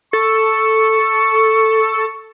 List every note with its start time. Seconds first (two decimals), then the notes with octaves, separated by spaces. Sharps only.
0.13 A4 C#6